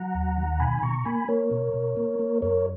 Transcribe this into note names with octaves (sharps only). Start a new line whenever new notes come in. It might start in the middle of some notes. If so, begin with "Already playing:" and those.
Already playing: F#3 F#5 A#5
D#2
D#3
B2 G#5 B5
B5
B2 A#5 C#6
A#5
A#3 G#5 B5
A#3 A#4 C#5
B2
B2
A#3
A#3
F#2 A#4 C#5